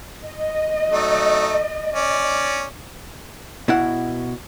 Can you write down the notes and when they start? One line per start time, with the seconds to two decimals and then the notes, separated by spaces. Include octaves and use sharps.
0.24 D#5
0.91 F#3 A3 D#4
1.93 C#4 D5
3.68 B2 E4 F#5